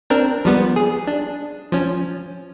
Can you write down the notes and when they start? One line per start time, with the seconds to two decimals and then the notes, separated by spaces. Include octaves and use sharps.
0.10 C4 D4 A#4
0.45 F3 G3 B3
0.76 G#4
1.07 D4
1.72 F3 C#4